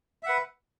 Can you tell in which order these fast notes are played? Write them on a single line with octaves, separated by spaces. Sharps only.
E5 F#5 B4